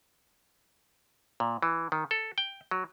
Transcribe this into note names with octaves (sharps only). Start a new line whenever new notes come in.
A#2
E3
D#3
A4
G5
F#3